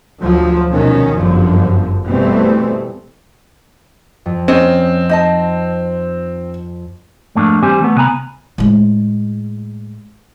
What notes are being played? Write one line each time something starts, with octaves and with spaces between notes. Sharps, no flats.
D2 F3 F#3
C2 B2 D#3 C#4
G1 F#2 D3 F3
B2 E3 G3 A3 B3 C4
F2
C4 C#4 D#5
D#4 D#5 A5
F2 G#2 A3 A#3 D4
E3 G3 C4 G4 C5 G#5
E3 A3 B3
C2 C3 B3 G#5 A#5 B5
A2 G#3